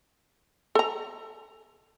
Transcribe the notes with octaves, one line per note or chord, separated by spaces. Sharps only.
A4 A#5